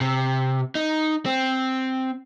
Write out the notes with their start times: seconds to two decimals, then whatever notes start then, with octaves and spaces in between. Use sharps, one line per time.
0.01 C3
0.75 D#4
1.26 C4